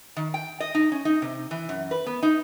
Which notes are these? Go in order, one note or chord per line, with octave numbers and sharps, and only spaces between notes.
D#3
G5
D#5
D#4
C#4
D#4
C3
E3
F#2
B4
B3
D#4